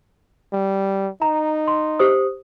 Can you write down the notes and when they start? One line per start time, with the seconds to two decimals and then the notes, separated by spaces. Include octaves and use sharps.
0.53 G3
1.22 D#4 A#5
1.68 C6
1.99 G4 C5 D#6